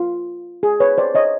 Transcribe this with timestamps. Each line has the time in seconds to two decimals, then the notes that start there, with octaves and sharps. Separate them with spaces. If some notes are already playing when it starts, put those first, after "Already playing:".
Already playing: F4
0.63 G#4
0.80 B4 C#5
0.98 C5 D5
1.15 C#5 D#5